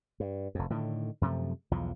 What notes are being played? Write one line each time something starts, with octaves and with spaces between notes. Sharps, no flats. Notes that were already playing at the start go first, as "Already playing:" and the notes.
G2
F1 F2
A2 D3 D#3
F#2 C3 F3 A3
B1 E2 F3